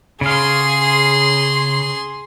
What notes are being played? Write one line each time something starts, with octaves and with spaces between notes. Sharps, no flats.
C#3 G#4 F5 C6